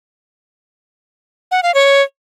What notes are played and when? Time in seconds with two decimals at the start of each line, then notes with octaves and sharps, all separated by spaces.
1.51 F#5
1.63 F5
1.74 C#5